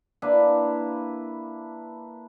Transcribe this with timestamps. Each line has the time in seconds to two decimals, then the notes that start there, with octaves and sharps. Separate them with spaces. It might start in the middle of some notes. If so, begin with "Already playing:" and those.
0.22 A#3 D4 E4 B4